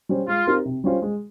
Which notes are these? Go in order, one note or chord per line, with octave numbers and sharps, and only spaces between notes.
G3 C#4 G4 C5
G#3 F4
C4 D#4 G4 A#4
C3
G3 C#4 F4 C5
G#3